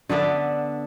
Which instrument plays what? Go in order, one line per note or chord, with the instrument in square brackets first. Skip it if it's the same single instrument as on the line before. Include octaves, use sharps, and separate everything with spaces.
[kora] D3 B3 D4 E5